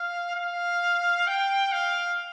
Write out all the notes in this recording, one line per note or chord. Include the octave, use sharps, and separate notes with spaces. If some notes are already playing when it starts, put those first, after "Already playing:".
Already playing: F5
F5
G5
F5